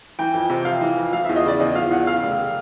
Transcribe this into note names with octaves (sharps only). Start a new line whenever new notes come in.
E3 G5
F2
C3
F2 F5
E3
F2
F3 F5
E2 E5
D#5
C#3 D5
E2 D#5
F3 F5
E2 F#5
C#3 F5
F1